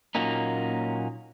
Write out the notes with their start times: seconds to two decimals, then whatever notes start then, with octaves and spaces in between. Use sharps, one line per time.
0.15 A#2 F#3 A#3 C#4 D#4